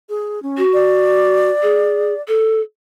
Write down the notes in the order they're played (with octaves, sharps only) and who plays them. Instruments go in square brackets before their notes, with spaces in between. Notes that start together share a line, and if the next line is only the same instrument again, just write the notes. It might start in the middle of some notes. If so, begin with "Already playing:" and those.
[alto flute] G#4
C#4
[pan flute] F#4
[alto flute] D5
[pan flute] G#4
A4